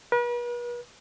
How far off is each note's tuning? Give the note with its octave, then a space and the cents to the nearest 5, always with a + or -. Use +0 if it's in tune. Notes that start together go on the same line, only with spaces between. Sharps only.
B4 -40